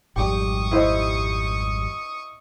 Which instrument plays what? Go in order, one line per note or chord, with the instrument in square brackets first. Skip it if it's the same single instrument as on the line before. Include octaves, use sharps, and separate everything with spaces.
[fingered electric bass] G#1 F2 [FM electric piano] G3 G4 [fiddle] C#6 D#6
[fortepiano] E4 C5 D#5